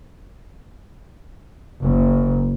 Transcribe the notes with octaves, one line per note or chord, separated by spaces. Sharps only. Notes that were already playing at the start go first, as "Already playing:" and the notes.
F#1